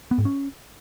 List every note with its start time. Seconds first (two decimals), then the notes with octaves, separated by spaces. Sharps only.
0.11 B3
0.18 G#2
0.25 C#4